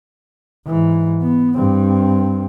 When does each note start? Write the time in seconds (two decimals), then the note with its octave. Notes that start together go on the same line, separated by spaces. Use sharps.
0.66 G#2 E3
1.22 B3
1.57 G2 C4